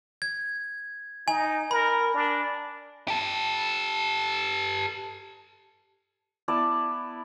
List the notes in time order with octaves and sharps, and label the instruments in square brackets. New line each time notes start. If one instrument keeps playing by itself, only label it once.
[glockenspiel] G#6
[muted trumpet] D#4 [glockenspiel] G#5
[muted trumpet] A#4 [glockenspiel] B5
[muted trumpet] D4
[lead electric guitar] G4 A4
[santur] B3 E4 D5 A5